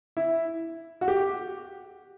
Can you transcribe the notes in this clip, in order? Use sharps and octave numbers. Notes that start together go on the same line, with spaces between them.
E4
F#4
G4